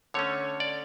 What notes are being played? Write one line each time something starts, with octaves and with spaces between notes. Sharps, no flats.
D3 A3 C#4 C#5
D5